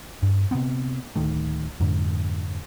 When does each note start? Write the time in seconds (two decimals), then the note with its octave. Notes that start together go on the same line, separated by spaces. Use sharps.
0.23 G2
0.51 C3 F3 B3 C4
1.16 D1 D#3 A3
1.80 F2 G#2 D3